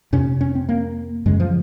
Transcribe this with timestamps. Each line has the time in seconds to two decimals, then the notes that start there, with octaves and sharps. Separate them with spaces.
0.13 F2 C3 C#4
0.41 C#4
0.55 C4
0.69 A#3
1.26 F#2 C#3 G#3
1.40 F3